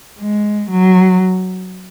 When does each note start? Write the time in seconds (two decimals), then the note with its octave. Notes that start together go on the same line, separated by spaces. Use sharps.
0.19 G#3
0.70 F#3